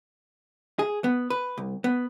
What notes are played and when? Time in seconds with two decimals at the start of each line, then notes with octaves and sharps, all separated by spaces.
0.79 G#4
1.04 B3
1.30 B4
1.57 C2
1.84 B3